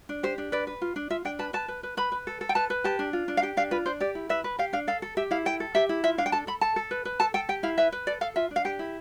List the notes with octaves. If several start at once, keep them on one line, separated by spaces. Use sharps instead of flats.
D4
G4 C5
D4
B4 D5
B4
F4
D4
F4 E5
D4 G5
B4 A5
B4 A5
B4
B4
B4 B5
B4
A4
A4
G5
B4 A5
B4
G4 A5
D4
F4
D4
F5
G4 G5
D4 F5
F4 B4
D4 C5
G4 D5
E4
B4 E5
B4
G4 F5
D4 F5
A4 F5
A4
G4 E5
E4 F5
A4 G5
A4
G4 E5
E4
F4 E5
D4 F5
G5
A4 A5
A4 B5
A4 A5
A4
B4
B4
A4 A5
A4 G5
G4 G5
E4 F5
B4 E5
B4
A4 D5
A4 F5
F4 E5
D4
F5
G4 G5
E4